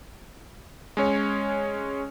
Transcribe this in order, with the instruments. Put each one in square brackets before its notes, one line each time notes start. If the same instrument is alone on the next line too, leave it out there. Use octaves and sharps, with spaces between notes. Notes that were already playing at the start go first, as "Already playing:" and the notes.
[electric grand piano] G#3 C#4 C#5